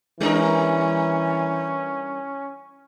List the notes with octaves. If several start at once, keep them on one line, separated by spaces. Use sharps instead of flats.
E3 G3 C#4 D4 A#4